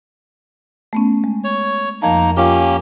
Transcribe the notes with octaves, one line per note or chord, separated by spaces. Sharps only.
A3 B3 C#4
G#3
C#5
F2 F3 A#3 D#4 A5
F3 A#3 C#4 F4 G4